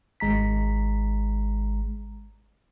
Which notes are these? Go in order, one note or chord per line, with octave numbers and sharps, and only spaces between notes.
G#1 G#3 A#5 B6